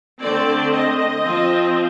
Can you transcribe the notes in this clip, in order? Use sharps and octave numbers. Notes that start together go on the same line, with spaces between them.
D3 A3 C4 D5
D#5
F3 C4